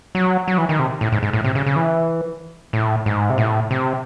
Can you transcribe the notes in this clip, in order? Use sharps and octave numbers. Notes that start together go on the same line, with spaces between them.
F#3
F#3
E3
D#3
C3
A2
G#2
G#2
A2
C3
C#3
C#3
E3
A2
G#2
C3
A2
C3